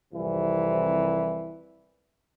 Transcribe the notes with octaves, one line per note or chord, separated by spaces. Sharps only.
C2 F2 C3 E3